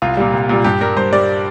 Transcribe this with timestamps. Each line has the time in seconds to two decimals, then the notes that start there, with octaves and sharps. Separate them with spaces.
0.02 C2 F4
0.17 A#2 G3
0.33 C2
0.49 A#2 G3
0.64 G2 G4
0.81 G3 A#4
0.97 G2 C5
1.12 G3 D5